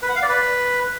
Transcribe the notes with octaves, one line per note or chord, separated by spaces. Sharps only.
B4
F#5
F5
D5
B4